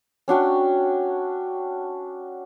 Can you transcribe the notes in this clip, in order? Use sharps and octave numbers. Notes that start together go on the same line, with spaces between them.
C#4 D4 F#4 G5